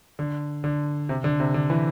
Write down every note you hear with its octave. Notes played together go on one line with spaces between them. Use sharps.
D3
D3
C3
D3
C3
D3
E3